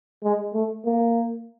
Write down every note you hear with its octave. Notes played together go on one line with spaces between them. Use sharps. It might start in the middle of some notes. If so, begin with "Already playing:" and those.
G#3
A3
A#3